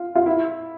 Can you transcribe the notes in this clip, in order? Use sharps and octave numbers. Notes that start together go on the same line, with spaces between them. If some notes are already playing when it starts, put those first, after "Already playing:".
Already playing: F4
F4
E4